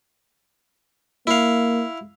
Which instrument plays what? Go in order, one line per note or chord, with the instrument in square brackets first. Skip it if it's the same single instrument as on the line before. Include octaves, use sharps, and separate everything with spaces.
[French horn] A#3 [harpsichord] E4 F5